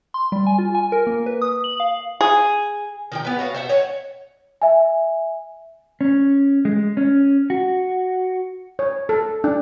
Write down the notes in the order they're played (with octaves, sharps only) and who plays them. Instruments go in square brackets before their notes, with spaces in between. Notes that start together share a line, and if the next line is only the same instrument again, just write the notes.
[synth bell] C6
G3
G#5
F4
G#5
A#4
A#3
B4
D#6
F#7
F5
[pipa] G#4
[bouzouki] D#3 F3 G5
B3 B4
C#4 F#4 F5
C5 E5 F#5
C#5 D#5 F#5
[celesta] E5 G#5
[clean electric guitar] C#4
G#3
C#4
F#4
[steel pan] C#5
A4
D4